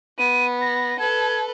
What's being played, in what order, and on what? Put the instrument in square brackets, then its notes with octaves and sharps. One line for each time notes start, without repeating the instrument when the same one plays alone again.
[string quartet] B3 [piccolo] D#7
[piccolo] A#6
[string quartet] A4 B4 [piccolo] G#6